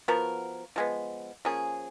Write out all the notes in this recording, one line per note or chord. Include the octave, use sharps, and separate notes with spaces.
F3 B3 F#4 A#4
F3 G#3 B3
F3 A#3 C#4 G#4